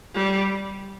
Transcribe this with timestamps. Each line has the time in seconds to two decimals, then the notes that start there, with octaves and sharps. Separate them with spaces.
0.14 G3